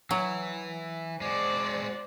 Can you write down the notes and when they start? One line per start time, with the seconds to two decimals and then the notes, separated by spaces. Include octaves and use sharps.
0.11 E3 F#3
1.21 G#3 F#4 C5 D5